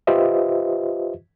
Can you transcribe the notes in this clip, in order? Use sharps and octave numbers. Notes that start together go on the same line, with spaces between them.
F4 G4 B4 C5 D#5 E5